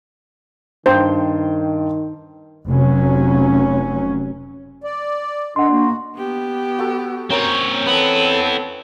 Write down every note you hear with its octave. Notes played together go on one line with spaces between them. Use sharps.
G2 D#3 C5 G5 C6
F1 F#3 C#4
D5
D4 A4 D#5 F#5 C6
A#3 F#4
B3 G4
F#4 A4
C4 C#4 A#4 C#5 G5
B3 C4 E4 A4 B4 G5